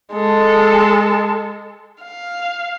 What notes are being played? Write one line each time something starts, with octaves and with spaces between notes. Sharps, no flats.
G#3 A4
F5